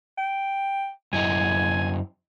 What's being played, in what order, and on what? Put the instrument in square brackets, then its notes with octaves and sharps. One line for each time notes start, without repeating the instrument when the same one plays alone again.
[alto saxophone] G5
[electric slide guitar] F#2 E4 D#5 [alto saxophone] G#5